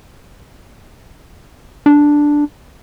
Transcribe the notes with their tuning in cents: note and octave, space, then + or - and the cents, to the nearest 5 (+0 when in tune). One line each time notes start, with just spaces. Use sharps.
D4 +0